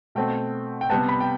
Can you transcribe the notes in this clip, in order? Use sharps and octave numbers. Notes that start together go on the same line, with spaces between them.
B2 A3 C4 G5
G5
C3 G3 B3 A5
B5
G5